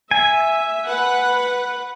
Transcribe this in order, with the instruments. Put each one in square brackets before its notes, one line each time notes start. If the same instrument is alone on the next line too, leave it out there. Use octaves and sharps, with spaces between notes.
[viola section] E5 [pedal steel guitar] G#5
[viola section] B4 F#5